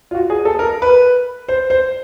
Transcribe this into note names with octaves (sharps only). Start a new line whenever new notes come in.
F4
F#4
G#4
A4
A#4
B4
C5
C5